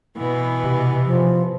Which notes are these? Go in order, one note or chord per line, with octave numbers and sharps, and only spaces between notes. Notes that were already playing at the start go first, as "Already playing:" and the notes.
B2 E3 B3
C3
F3